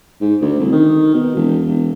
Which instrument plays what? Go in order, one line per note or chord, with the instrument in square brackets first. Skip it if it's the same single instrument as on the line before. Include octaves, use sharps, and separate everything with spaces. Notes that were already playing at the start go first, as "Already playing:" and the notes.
[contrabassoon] G#2
D2
C2
D#3
B2
E1
E1